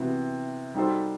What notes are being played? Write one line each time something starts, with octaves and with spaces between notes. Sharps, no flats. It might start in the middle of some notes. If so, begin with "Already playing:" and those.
Already playing: C3 E3 B3 F#4
G3 D#4 F#4 A4 C5